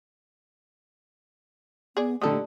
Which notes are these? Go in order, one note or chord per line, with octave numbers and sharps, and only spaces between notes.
B3 G#4 D5
D3 G3 A3 D#4 G4 A4 D#6